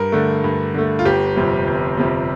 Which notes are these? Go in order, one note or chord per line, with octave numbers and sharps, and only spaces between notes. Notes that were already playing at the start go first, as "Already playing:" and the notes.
Already playing: G2 A#4
D3 A3
G2
D3 A3
F4
G1 G4
F2 C3 G3
G1
F2 C3 G3